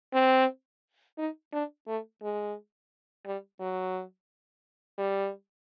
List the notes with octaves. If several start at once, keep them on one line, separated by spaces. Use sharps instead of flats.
C4
D#4
D4
A3
G#3
G3
F#3
G3